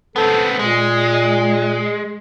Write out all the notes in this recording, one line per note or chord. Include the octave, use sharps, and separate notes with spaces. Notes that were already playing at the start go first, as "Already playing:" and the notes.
B3 C4 A4
A#2 G#3